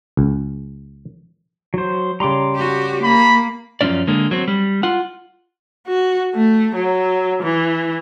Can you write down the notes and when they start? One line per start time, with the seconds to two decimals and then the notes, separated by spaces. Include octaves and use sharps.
0.17 C#2
1.74 F#3 C5
2.20 C#3 G3 A#5 C6 D6
2.55 F#4 G4
3.03 A#3 B5
3.81 F#2 E3 F3 C#4 D5
4.07 D3 G#3 A#3
4.31 F#3 C4
4.48 G3
4.83 F4 F#5
5.87 F#4
6.35 A3
6.76 F#3
7.43 E3